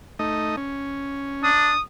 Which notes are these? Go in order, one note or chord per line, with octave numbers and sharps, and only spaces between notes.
A3 D#4 D#5
C#4
D4 D#6